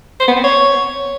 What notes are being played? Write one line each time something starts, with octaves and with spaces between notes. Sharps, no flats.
C5
B3
C4
C#5